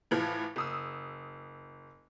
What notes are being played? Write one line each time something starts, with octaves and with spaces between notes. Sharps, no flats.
A2 E3 F3
F#1 D#6 E6